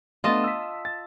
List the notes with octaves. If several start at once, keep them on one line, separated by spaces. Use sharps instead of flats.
A3 B3 D4 F4 D#5 A5
E6 B6
A6